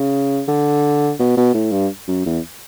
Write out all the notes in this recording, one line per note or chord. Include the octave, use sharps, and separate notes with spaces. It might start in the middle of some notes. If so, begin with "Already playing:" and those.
Already playing: C#3
D3
B2
B2
A2
G2
F#2
E2